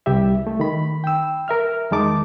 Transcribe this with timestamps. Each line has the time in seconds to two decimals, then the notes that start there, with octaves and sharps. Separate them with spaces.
0.06 C2 G3 G4 E5
0.47 A3
0.60 D#3 B5
1.04 G5 E6
1.48 A#4 E5 F6
1.91 E2 D#3 G#3 D#4 A5 D6